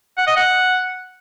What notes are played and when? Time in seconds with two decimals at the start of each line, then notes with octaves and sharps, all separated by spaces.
0.18 F#5
0.27 D#5
0.36 F#5